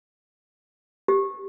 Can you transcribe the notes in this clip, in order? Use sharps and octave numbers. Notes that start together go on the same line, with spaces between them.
G4